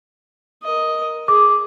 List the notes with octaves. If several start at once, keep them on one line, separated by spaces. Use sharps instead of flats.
A#4 D#5
G#4 D6